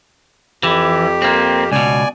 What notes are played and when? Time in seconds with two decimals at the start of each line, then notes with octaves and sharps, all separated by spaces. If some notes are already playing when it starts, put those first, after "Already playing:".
0.63 F2 E3 G4
1.22 A#3 C4
1.72 C#2 B2 D5 G#5